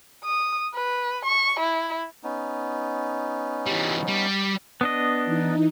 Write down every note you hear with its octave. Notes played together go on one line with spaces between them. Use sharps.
D#6
B4
C#6
E4
B3 C#4 D#4
E3 G3
G3
B3 D4 D#5
E3 D#4